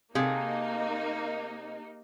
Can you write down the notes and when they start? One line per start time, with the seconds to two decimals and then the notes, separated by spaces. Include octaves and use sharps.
0.15 C3 A#3 D#4 G#4 A4 F5